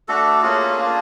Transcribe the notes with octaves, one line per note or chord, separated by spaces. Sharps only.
A3 D4 F#4 A4
A#3 C#4 F4 G#4
A#3 D4 F4